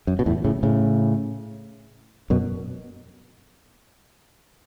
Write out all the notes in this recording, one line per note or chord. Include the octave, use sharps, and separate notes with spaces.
F#2
B2
E2 A2
A2 C#3
A2 C#3
F#2 B2